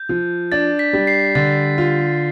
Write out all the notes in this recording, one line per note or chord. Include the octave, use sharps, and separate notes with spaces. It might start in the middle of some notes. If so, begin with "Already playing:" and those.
Already playing: G6
F3
D4 A6
B6
G3
C7
D3 A6
F4